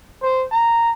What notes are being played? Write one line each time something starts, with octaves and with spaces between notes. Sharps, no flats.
C5
A#5